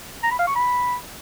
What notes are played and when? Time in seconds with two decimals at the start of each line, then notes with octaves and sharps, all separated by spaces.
0.23 A#5
0.31 B5
0.39 F5
0.47 C#6
0.55 B5